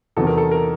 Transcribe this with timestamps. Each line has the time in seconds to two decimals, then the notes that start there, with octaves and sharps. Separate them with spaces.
0.17 E2 C3 D#3 F#3 A4
0.27 A#4
0.38 A4
0.51 A#4